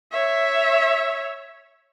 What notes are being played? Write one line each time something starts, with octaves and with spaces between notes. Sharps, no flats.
C#5 E5